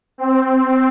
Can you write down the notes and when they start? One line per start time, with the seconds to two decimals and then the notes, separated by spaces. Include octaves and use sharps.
0.18 C4
0.52 C4